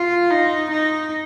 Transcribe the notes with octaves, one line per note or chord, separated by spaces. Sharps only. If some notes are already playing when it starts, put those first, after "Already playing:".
Already playing: F4
D#4
D#4